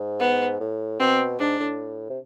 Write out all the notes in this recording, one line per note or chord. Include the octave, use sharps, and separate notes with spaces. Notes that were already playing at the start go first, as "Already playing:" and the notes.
Already playing: G#2
B3
A2
B2 C4
G#2 D4
A2
C3